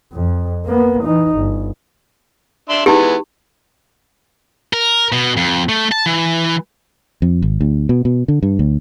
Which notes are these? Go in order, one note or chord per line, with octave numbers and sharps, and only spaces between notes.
F2
A#3 B3
E3 D#4
G1
D4 E5 C6
E3 G#3 B3 D#4 G4
A#4
B2
F2
A3
A5
E3
F2
G#1
D2
B2
B2
D3
G2
D2